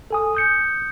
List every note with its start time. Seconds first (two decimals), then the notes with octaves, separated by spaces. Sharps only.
0.11 A4 G#5 D#6
0.35 D#6 G6 C#7